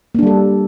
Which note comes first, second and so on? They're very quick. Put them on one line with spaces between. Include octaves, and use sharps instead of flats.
A#3 D4 G3 A4